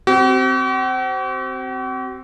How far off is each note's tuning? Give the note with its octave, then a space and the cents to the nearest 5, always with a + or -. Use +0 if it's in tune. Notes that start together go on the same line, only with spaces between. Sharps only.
C4 +0 F#4 +45